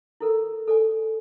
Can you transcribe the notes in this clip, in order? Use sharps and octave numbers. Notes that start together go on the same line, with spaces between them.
E4 A4 A#4
A4 D5 G#5